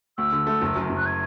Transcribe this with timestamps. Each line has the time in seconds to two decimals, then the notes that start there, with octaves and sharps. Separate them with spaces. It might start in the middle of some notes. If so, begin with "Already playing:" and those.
0.18 D2 E6
0.32 D3
0.47 A3
0.62 F#1
0.76 F#2
0.90 F#1
0.97 F#6
1.05 G#6